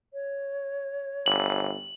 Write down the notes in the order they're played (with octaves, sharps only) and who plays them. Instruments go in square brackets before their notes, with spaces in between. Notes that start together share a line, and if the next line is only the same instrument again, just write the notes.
[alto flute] C#5
[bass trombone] G1 [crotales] F#7